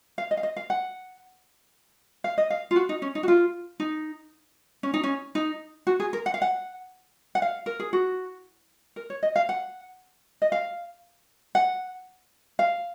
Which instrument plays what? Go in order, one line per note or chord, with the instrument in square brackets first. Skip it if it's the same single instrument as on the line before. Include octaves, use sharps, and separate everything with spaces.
[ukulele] F5
D#5
F5
D#5
F5
F#5
F5
D#5
F5
F4
F#4
D#4
C#4
D#4
F#4
F4
D#4
C#4
D#4
C#4
D#4
F#4
G#4
A#4
F#5
F5
F#5
F#5
F5
A#4
G#4
F#4
A#4
C#5
D#5
F5
F#5
D#5
F5
F#5
F5